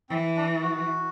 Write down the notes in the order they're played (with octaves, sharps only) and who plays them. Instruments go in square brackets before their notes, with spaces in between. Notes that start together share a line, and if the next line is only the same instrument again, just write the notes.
[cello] E3 [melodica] C4
[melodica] D4
F#4